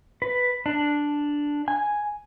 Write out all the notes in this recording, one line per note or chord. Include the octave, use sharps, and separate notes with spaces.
B4
D4
G#5